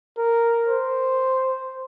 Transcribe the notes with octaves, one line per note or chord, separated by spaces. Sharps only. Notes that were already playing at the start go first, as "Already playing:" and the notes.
A#4
C5